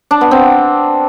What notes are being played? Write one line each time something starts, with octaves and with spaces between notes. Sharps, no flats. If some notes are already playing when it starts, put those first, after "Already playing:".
D4
B3
C4